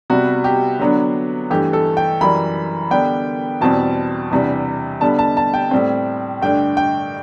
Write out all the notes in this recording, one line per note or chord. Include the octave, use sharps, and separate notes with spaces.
C3 G3 B3 F#4
G4
D3 F#3 B3 D4
G2 E3 A3 G4
A4
G5
F#2 E3 G3 B5
D3 G3 B3 D4 G5
E2 B2 G3 C4 A5
E2 C3 G3 D4
D3 G3 B3 A5
A5
A5
G5
A2 G3 C4
G2 D3 A3 D4 G5
G5